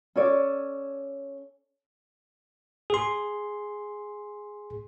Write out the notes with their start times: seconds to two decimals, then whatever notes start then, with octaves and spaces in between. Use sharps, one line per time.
0.16 C#4 A4 C#5 D5
2.90 G#4 C6